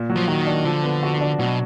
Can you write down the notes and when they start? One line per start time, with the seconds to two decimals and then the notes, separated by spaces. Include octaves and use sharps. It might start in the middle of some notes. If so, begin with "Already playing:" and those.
Already playing: A#2
0.10 F#3
0.16 F3
0.28 D#3 F#4
0.46 D4
0.65 D3 F3
0.83 B3
1.03 F#4
1.21 D4
1.39 B2 F#3